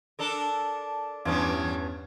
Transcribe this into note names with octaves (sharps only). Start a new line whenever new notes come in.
D4 A4 A#4
E2 G2 E3 G3 C#4